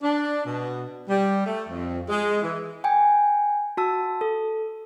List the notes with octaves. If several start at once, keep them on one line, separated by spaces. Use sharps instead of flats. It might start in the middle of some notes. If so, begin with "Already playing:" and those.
D4
B2
G3
A3
F2
G#3
E3
G5 G#5
F#4 A5 E6
A4